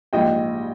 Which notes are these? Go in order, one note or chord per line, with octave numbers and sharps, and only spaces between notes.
A#1 G#2 G3 D#5 G5